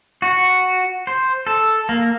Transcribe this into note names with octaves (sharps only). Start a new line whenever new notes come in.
F#4
C5
A4
A#3